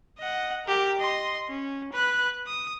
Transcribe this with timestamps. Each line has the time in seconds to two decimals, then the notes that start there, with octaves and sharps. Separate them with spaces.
0.19 D#5 F#5
0.66 G4 A#4
0.99 D#5 C6
1.50 C#4
1.93 B4 F#6
2.47 D#6